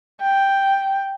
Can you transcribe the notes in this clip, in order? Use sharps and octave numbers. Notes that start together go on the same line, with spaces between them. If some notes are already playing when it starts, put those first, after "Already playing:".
G5